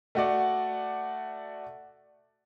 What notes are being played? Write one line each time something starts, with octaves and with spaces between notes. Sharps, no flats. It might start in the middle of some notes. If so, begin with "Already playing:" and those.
A3 F#4 D5